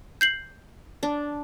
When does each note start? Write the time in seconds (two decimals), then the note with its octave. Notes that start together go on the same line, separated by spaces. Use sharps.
0.21 G6 C7 F#7
1.03 D4